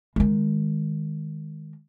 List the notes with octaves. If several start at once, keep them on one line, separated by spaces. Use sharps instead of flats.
D#3 G#3